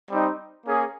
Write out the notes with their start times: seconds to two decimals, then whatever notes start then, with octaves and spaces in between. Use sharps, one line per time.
0.10 G3 C4 D#4
0.64 A#3 C#4 G#4